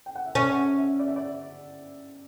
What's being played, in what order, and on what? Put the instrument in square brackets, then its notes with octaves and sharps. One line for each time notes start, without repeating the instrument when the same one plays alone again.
[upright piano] G5
F#5
E5
[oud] C#4 [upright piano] D5
[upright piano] F#5
E5
E5
D5
E5
D5